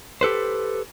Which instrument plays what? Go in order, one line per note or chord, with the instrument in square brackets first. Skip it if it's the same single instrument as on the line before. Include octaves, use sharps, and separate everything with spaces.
[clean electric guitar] G4 A4 B4 C5